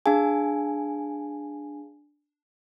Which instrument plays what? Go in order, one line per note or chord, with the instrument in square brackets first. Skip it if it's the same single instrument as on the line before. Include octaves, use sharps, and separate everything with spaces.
[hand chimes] D4 G#5 [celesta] G#4 F5 A5